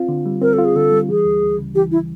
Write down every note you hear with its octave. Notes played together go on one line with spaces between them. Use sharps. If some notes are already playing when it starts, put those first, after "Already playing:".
Already playing: C4 F4
D3
G3
C4 A#4
A4
F4
G#4
D3 A4
G3
E3 G#4
D2
D2
C#3
E3 G4
E4